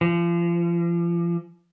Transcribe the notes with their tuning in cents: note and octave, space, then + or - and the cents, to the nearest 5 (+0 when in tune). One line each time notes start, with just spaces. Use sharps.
F3 -35